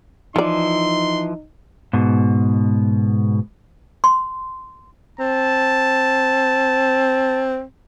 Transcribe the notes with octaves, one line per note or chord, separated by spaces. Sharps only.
E3 F3 D#4 F4 D5 C6
G#2 B2
C6
C4 A5